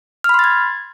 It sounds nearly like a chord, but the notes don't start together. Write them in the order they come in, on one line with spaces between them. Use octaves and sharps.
F6 B5 C6 A6 G#6